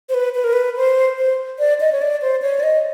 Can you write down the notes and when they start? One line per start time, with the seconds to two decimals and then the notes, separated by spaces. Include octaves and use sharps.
0.09 C5
0.14 B4
0.34 B4
0.44 A#4
0.53 B4
0.77 C5
1.18 C5
1.59 D5
1.80 D#5
1.92 C#5
2.02 D5
2.22 C5
2.42 C#5
2.60 D5
2.63 D#5